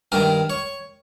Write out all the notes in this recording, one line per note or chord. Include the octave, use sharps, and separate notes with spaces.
G2 D#3 A#4
C#5